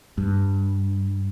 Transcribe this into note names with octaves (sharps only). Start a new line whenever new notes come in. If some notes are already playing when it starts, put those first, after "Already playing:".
G2